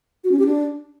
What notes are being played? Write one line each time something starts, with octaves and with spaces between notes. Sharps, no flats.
F#4
C#4
G4
D4